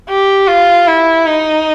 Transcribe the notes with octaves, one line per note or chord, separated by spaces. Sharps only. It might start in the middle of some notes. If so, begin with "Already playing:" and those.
G4
F4
E4
D#4